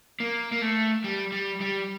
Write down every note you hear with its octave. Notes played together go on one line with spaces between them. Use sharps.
A#3
A#3
A3
G3
G3
G3